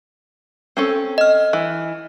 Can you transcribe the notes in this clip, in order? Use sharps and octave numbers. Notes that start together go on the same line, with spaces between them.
C4 C#4 A4
D#5 F6
E3